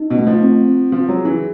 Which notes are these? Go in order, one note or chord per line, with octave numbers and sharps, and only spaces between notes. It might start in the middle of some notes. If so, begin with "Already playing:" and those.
Already playing: D#4
B2
A3
F3
C4
C4
F3 B4
F#3
G#4
E3